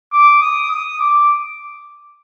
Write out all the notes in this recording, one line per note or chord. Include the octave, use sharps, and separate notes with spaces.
D6
D#6
D#6
D6